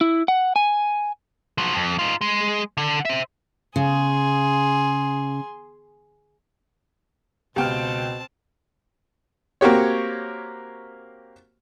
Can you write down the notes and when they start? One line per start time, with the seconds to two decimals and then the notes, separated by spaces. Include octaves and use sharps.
0.01 E4
0.28 F#5
0.56 G#5
1.58 F3 F#3
1.74 F2
1.99 D#4 F4
2.21 G#3
2.77 D3
3.05 C5 E5
3.76 C#3 G#4 C6
7.56 C#2 B2 B3 C4 G4 G5 A5 F6
9.61 A#3 C4 F#4 G4 C#5